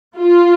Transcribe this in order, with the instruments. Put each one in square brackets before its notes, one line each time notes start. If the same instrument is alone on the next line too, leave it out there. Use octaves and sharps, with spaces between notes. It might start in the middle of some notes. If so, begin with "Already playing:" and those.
[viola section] F4